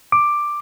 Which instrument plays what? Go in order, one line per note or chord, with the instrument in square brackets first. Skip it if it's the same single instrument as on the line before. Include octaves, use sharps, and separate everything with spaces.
[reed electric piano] D6